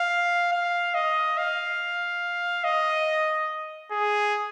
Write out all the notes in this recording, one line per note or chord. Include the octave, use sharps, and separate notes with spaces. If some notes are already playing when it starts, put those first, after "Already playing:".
Already playing: F5
F5
D#5
F5
D#5
G#4